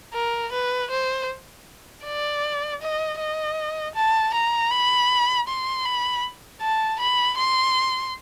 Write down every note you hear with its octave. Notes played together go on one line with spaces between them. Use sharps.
A#4
B4
C5
D5
D#5
D#5
A5
A#5
B5
C6
B5
A5
B5
C6